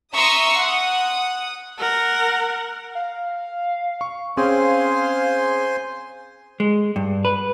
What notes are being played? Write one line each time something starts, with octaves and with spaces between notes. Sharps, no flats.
E5 A#5 C6 C#6 D#6 E6
F#5 D#6
A#4 F#5
F5
C#6
C4 C#4 G#4 C5 F5 G#5 C6
G#3
G2
B4